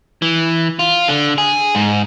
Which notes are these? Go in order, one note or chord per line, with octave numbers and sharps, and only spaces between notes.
E3
F4
D3
G#4
G#2